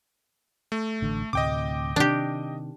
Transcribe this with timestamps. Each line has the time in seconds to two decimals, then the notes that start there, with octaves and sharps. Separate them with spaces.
0.72 A3
1.02 A1 D3
1.33 D2 A2 C3 D#5 G5 D6
1.96 C3 D#3 D4 G4